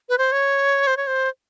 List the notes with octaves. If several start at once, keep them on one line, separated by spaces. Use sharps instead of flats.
B4
C5
C#5
C5
C#5
C5